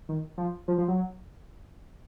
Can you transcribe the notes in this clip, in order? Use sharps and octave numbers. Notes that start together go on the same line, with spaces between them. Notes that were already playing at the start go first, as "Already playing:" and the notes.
D#3
F3
F3
F3
F#3